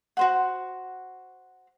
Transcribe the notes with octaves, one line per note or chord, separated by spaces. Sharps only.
F#4 C5 F#5